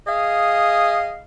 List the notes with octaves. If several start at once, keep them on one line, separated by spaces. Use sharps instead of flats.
G#4 D#5 F5